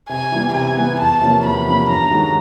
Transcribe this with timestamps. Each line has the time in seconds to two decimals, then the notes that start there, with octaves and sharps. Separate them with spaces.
0.09 C3 G#5
0.32 E3 G3 B3
0.54 C3 G#5
0.77 E3 G3 B3
0.99 E2 A5
1.21 C3 F3 A#3 C#4
1.44 E2 B5
1.66 C3 F3 A#3 C#4
1.89 G2 A#5
2.11 D#3 G#3 C#4 F#4